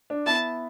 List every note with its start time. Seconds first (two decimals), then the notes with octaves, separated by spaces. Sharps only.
0.10 D4
0.26 B3 E4 A5